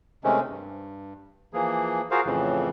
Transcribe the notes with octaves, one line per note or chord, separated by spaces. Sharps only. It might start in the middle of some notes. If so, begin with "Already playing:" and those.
C3 D#3 G#3 A3 C4 C#4
G2
E3 F3 A#3 G#4
F4 F#4 G#4 A#4 C5 F5
F2 A2 C#3 E3 F3